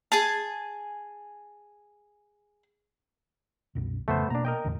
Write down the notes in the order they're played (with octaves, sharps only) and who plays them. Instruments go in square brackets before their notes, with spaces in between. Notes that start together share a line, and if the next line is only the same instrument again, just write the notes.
[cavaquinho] G#4 G#5 A5
[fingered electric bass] C2 F#2 B2
[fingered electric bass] A1 F2 C#3 [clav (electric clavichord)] A3 B3 C5
[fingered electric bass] B2 A#3 [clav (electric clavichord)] D4 A#5
[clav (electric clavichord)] A#4 D#5 G5
[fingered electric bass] E2 A2 D3